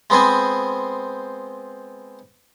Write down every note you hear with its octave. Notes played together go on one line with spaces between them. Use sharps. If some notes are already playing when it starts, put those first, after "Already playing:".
G#3 B3 C4 C5 G#5